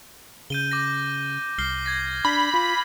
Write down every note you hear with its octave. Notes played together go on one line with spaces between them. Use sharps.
C#3 G6 D#7 G7
D6 A#6
C2 F6 C7 G7
G#6 A#6
D4 B5
F4